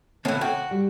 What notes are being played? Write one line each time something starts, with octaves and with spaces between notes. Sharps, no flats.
A2 C#3 E3 C4 C#4
F#4 G5
G3